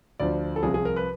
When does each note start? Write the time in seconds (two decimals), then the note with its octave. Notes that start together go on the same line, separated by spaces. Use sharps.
0.20 D2 D3 F3 D5
0.56 A4
0.63 C2 C3 F3 G#4
0.74 G#4
0.85 A#4
0.96 B4